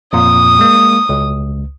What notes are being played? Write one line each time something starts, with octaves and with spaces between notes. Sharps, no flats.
F2 A#2 D#6
G#3 A#3
C#2